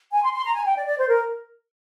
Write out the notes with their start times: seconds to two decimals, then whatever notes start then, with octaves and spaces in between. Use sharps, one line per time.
0.12 G#5
0.23 C6
0.34 C6
0.44 A#5
0.54 G#5
0.65 G5
0.76 D5
0.86 D5
0.97 C5
1.08 A#4